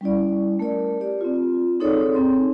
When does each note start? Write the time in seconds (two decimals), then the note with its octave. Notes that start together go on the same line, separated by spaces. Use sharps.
0.01 G3 C#4 E4 D5
0.59 A3 A#4 D5
1.00 G4 D5
1.21 C4 F4
1.80 C4 D#4 G#4 A4 C#5 D5
2.14 C4 C6